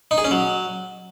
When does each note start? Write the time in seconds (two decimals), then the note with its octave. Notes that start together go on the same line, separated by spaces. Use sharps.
0.11 D#4
0.18 G#4
0.24 C#4
0.31 F#3